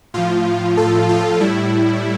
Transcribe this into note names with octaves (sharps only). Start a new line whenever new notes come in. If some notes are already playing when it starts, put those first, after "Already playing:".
A2 F3 F4
A4
F4
A2 G3 E4